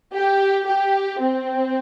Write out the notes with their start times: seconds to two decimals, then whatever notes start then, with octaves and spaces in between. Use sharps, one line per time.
0.13 G4
0.65 G4
1.20 C4